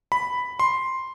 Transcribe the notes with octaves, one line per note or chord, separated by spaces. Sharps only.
B5
C6